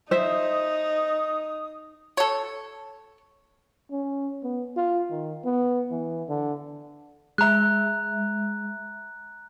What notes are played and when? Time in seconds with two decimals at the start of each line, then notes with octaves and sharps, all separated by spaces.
0.11 D#4 C5 E5 D#6
2.17 A4 C#5
3.91 C#4
4.44 B3
4.76 F4
5.10 D#3
5.45 B3
5.91 E3
6.29 D3
7.38 G#3 E5 A#5 F#6